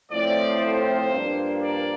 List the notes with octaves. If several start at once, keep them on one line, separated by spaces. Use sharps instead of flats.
A2 F3 C4 D5
C5
G2 F3 A#3 D4
D5